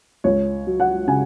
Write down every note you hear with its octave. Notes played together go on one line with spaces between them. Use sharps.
C#2 C#5
F#3
F#5
C#3 G#5